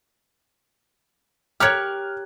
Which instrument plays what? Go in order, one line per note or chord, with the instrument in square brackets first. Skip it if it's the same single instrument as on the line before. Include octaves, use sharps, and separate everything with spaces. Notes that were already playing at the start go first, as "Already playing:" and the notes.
[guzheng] G4 A#4 C#5 [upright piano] F6 F#6 G#6